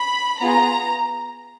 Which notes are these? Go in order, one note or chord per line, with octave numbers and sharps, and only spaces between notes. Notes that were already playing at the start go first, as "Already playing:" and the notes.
Already playing: B5
B3 F4 G#4 A#5